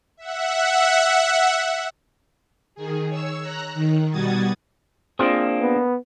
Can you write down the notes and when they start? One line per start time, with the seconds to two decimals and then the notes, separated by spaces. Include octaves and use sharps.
0.17 E5 F#5
2.75 D#3 G#4
3.09 C#5 E6
3.42 A#5 F#6
3.75 D#3
4.10 B2 G3 F#4 D#6 G#6 A6
5.19 A#3 C4 D4 F4 G#4
5.61 B3